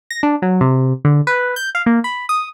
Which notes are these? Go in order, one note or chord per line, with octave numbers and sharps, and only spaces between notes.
A#6
D4
F#3
C3
D3
B4
G6
F5
A#3
B5
D#6